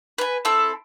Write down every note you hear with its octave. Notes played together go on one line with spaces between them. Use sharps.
B4 G#5
C4 E4 A4 E6